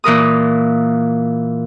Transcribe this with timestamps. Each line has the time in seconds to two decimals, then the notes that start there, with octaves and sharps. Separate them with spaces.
0.04 A#2 E3 A#4 D#6